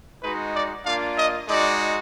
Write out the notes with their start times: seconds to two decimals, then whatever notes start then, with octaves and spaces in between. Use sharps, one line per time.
0.23 G#3 D#4 F#4 B4
0.55 D5
0.85 A#3 D4 F4 F5
1.17 D#5
1.48 G#3 D#4 F#4 D5